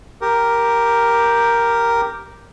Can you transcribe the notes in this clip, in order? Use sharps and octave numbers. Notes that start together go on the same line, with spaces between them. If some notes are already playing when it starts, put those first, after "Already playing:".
G4 A#4